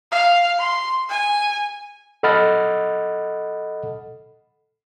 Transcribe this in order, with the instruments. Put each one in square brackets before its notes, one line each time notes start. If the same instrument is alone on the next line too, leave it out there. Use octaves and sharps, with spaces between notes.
[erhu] F5
C6
G#5
[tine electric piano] A4 D#5 F#5 B5 F6 A6